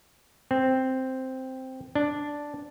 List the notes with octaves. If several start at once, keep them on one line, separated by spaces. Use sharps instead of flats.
C4
D4